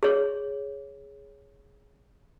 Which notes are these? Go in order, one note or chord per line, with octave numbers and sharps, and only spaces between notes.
G#4 C#5